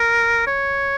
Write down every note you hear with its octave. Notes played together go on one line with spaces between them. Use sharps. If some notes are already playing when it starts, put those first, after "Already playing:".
Already playing: A#4
C#5